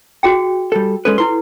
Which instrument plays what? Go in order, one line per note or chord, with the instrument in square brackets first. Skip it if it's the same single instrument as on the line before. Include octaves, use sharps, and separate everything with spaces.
[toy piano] F#4 G#4 G5
[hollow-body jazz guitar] G3 A4
[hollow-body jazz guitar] G#3 C#4 B4 [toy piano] A4
[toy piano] E4 B4 [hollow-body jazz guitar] C6